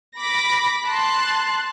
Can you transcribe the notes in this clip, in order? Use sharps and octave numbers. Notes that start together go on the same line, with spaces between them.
B5 D6 A#6 B6
A5 C6 F#6